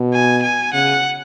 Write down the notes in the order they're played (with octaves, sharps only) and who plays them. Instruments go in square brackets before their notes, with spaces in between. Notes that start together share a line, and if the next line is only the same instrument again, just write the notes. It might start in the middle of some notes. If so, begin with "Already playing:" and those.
Already playing: [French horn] B2
[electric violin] G#5
G#5
[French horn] C#3 [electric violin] F#5